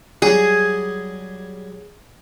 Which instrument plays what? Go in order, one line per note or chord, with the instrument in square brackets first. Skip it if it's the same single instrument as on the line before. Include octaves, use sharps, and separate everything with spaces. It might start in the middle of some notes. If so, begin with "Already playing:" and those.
[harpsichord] F#3 G3 [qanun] G#4